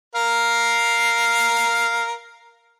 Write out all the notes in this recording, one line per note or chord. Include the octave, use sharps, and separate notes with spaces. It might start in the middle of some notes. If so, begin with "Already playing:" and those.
A#4 F5